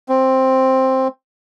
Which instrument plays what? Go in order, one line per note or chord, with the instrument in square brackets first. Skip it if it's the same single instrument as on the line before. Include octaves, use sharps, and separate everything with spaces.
[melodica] C4